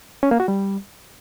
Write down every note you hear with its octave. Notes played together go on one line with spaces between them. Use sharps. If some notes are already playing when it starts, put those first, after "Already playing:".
C#4
A#3
F#4
G3